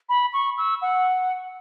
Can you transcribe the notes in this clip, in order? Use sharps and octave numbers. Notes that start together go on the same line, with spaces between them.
B5
C#6
E6
F#5